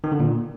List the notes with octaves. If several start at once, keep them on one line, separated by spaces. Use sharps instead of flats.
D#3
D3
A#2